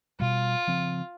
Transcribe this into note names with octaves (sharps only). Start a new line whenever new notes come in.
B2 G3 F4
C#3 F3 C4